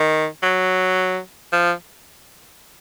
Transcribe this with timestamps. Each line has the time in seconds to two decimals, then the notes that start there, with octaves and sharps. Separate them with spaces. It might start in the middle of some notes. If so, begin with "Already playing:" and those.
Already playing: D#3
0.43 F#3
1.53 F3